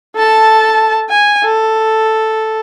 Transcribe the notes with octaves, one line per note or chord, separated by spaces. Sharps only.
A4 A5
G#5
A4